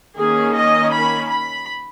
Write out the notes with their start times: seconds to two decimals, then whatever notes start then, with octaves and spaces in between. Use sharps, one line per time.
0.17 D#3 A#3 C#4 G#4
0.54 D#5
0.92 B5
1.29 B5